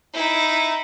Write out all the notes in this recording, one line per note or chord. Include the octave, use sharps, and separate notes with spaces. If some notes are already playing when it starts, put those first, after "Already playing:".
D#4 E4